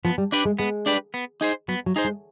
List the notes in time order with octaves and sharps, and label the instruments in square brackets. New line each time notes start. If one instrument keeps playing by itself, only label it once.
[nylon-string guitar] F3 [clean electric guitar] B3
[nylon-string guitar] G3
[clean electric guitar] D4 G4 B4 D5
[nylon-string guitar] G#3
[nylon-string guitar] G#3 [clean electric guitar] B3
[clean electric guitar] D4 G4 B4 D5
B3
D#4 G#4 C5
[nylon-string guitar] F#3 [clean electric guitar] B3
[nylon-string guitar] F#3
[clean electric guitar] D#4 G#4 C5
[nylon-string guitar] G#3